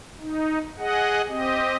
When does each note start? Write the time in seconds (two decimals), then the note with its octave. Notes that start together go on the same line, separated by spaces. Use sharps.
0.20 D#4
0.79 G#4 D#5 F#5
1.29 C4 G4 D#5